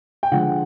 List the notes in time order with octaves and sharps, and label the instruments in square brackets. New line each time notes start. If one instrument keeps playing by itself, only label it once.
[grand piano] G5
D3 F3 G#3 F#5